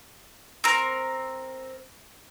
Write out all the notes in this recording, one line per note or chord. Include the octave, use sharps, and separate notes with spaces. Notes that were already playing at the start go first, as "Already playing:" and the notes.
C4 A#4